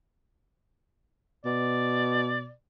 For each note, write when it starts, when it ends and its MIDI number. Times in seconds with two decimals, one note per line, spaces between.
1.45 2.51 47
1.45 2.49 74